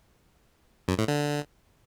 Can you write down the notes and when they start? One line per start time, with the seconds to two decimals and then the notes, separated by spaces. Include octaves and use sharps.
0.88 F#2
0.98 A2
1.08 D3